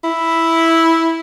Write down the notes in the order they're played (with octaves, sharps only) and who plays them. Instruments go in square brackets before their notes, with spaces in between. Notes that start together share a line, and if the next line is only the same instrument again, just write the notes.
[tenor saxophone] E4